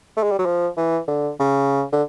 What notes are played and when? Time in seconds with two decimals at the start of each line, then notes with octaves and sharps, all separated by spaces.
0.17 A3
0.23 G#3
0.31 G3
0.39 F#3
0.46 F3
0.77 E3
1.08 D3
1.39 C#3
1.92 D3